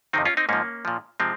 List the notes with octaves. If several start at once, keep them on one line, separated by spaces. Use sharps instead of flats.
F2 C3 D#3 C4 D#4
C#4 F4
C4 D#4
G#2 F3 A#3 C#4
A#2 F3
C3 F3 G#3 C4